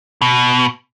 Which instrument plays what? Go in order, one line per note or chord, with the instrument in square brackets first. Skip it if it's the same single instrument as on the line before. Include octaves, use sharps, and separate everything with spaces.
[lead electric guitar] B2